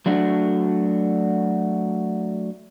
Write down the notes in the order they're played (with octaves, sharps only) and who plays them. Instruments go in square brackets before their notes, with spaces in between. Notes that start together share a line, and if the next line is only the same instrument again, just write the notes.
[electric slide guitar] F#3 A3 D4 F#4